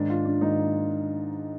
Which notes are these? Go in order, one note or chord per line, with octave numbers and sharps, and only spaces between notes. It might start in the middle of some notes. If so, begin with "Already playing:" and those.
Already playing: G#2 D#3 D4
F4
D4
G#2 D#3 D#4